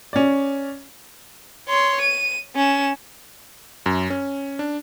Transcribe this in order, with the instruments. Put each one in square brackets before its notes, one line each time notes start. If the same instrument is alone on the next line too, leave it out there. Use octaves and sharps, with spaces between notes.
[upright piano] C#4 D5
[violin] C#5 C6
D#7
C#4 E7
[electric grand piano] F#2
C#4
D4